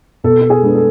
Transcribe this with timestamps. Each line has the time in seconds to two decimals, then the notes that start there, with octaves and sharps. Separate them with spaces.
0.24 B2 A4
0.41 A4
0.50 G#4
0.62 G#3 B3 D4
0.75 A4